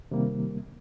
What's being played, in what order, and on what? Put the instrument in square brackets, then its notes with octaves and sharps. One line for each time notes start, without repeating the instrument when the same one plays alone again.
[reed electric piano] C3 D#3 G3 A#3